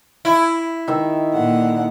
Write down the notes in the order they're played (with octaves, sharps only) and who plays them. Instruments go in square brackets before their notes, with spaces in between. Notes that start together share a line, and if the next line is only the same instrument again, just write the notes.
[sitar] E4
[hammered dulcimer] D#3 E5
[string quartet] A#2 D3 F#5